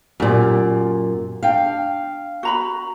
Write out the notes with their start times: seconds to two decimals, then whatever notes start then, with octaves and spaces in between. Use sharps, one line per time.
0.20 F#2 A#2 G4 D5
1.43 D4 F5 G5
2.43 F#4 A#5 B5